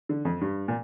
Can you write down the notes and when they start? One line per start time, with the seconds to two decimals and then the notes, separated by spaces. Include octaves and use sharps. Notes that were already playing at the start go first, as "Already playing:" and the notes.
0.09 D3
0.25 F2
0.41 G2
0.68 A#2